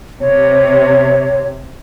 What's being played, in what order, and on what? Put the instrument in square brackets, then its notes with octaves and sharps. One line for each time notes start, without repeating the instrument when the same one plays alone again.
[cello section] C3 [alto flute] C#5